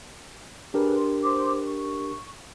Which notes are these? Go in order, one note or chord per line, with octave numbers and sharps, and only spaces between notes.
D4 G4 G#4 A#4 B4 B5
C6
C5 C6 D6
C#6